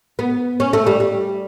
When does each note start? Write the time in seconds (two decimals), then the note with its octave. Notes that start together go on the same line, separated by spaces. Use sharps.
0.19 B3
0.60 C#4
0.73 A3
0.87 G3
1.00 G3